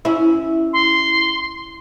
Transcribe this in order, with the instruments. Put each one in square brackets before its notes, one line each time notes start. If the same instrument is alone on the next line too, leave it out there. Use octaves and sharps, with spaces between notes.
[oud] C#4 E4
[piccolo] C6